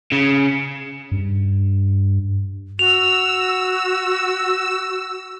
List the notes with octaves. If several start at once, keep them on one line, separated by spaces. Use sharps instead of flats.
C#3
G2
F#4 E6 F7